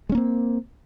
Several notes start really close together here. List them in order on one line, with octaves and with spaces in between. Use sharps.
G#3 C#4 A#3 C4